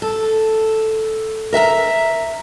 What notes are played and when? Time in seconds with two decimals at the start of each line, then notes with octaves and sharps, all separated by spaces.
0.02 A4
1.53 A#4 E5 F#5 A#5